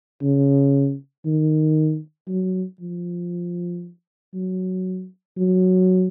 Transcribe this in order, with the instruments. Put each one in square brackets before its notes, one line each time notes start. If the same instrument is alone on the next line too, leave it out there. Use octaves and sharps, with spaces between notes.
[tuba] C#3
D#3
F#3
F3
F#3
F#3